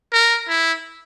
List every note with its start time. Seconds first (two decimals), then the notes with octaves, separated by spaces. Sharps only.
0.13 A#4
0.48 E4